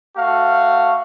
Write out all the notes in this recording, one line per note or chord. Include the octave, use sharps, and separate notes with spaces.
A3 F#4 F5